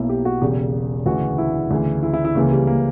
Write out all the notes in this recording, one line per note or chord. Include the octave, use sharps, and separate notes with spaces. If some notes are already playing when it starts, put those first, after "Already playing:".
Already playing: B1 B2 A#3 E4
G4
F#4
E1 E2 C#3 G4
D2 C#3 E3 F#4
E4
D2 C#3 E3
E4
E4
E4
C#2 C#3 E3 A#3
G3
A#3